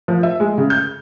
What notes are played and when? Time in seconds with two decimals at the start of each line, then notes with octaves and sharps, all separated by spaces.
0.08 F3
0.23 E5
0.40 G#3
0.58 C#3
0.70 G6